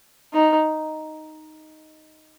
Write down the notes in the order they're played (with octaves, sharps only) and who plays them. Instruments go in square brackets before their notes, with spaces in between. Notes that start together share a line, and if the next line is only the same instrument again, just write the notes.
[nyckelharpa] D#4